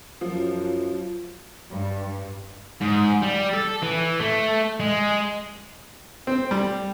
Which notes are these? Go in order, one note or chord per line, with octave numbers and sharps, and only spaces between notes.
F#2 F3
G2
G#2
G3
A4
E3
A3
G#3
C4
G3